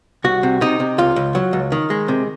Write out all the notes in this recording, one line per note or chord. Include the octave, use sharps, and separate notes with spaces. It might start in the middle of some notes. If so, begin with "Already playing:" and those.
C2 F#4
C3
C3 D#4
C3
C#2 F4
C#2
F#3
C#2
D#3
G#3
C3